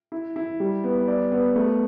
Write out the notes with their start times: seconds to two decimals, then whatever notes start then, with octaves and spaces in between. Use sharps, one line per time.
0.12 E4
0.36 E4
0.60 G3
0.84 B3
1.07 D5
1.32 B3
1.56 A3